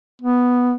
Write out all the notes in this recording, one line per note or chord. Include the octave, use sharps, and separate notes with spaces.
B3